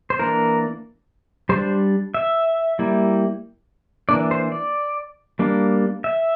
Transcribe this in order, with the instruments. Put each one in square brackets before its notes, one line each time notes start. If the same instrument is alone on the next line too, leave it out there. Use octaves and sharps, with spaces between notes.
[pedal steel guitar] C5
E3 A#3 D4 A#4
G3 D4 C5
E5
G3 A#3 E4
E3 A#3 D4 D5
C5
D5
G3 A#3 D4
E5